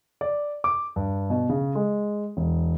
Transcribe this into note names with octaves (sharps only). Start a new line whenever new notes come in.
D5
D6
G2
B2
C#3
G#3
E1